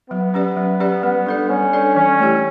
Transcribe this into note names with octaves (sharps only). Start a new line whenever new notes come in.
F#3 B3
C#4 G4 B4 D5
F#3
C#4 G4 B4 D5
G3 B3
D4 A4 D5
G3 C#4
D4 A4 D5
E3 C#4
A3 E4 G4